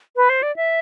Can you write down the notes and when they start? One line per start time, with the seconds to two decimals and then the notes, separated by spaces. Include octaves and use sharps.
0.16 B4
0.29 C5
0.42 D5
0.56 E5